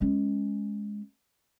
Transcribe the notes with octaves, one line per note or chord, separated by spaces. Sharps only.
G#3 C#4